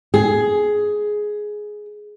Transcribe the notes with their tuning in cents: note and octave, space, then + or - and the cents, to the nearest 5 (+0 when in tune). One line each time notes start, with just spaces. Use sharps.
G#4 +10